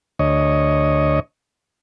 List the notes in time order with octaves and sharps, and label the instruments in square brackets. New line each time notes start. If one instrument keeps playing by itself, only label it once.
[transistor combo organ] D2 C#5 D#5